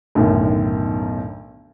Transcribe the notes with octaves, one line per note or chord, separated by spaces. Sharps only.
B1 F#2 A2 D3 D#3